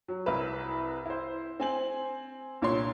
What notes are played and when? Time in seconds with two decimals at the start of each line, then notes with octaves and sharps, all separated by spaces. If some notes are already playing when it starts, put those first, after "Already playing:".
0.08 F#3
0.26 C2 E4 A#4 B4
1.06 E4 C5
1.60 C4 G#5 F#7
2.62 C2 A#2 D4 C#5 C6